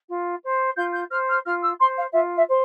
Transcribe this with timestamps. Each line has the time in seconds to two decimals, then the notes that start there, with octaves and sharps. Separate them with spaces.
0.08 F4
0.43 C5
0.76 F4 G6
0.93 G6
1.11 C5 F6
1.27 F6
1.45 F4 F6
1.62 E6
1.79 C5 C6
1.96 F5
2.12 F4 E5
2.36 E5
2.47 C5